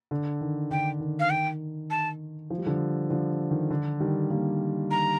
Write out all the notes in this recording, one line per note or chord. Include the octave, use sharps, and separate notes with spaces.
D3
D#3
D3 G5
D#3
F5
G5
A5
F3
G3
D3 F3
D3 F3
D#3
D3
D#3 G3
G3 A#3
A#5